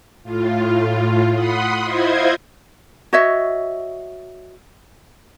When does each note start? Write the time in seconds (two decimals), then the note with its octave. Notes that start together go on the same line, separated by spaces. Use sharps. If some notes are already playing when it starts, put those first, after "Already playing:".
0.23 A2 F4
1.33 F#5 B5 C6 D#6
1.83 E4 F4 C5 D#5 G#6
3.13 F#4 C#5 D#5 E5